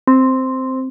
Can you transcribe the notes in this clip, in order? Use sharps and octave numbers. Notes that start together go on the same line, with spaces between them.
C4